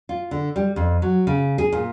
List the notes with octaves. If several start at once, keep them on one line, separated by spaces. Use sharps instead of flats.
F4
D3
G3
F2
F#3
C#3
G#4
A#2